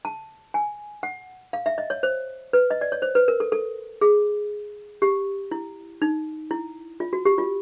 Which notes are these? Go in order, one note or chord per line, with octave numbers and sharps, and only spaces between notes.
A5
G#5
F#5
F5
E5
D#5
C#5
C5
B4
D#5
D5
C#5
C5
B4
A#4
A4
A4
G#4
G4
E4
D#4
E4
F4
F#4
G4
F4